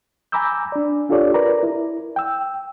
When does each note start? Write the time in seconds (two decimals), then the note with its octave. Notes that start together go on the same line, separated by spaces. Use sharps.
0.32 G#5 A#5 B5 D6 E6 G6
0.72 D4 D5
1.09 D4 F4 G4 A4 C#5 D5
1.34 A#4 B4 D5 A#5
1.63 E4
2.16 G5 E6